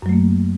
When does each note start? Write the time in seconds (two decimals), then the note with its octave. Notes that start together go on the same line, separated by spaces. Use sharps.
0.02 F#2
0.06 F#3
0.09 A3
0.13 A#3